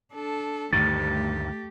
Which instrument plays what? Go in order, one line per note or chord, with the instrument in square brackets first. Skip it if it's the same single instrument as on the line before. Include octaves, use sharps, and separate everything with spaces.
[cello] D4 A4
[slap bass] D2 G2 D#3 [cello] A3 G4 [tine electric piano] A6